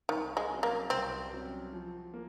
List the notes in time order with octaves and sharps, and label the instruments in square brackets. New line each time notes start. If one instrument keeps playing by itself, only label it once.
[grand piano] C2 [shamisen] D#3
[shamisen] G#3
[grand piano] C3 F#3 C#4
[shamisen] A#3
[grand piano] C2 [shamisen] C4
[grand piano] C3 F#3 C#4
F3
A#3